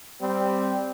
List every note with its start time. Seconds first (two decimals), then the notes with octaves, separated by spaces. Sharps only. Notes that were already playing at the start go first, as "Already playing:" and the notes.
0.21 G3 C4